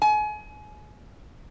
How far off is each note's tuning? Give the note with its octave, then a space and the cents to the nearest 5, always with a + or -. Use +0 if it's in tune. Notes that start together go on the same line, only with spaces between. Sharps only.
G#5 +30